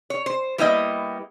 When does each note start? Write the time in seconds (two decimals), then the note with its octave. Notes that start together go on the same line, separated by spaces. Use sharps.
0.10 C#5
0.26 C5
0.58 G3 A#3 B3 E4 A4 D#5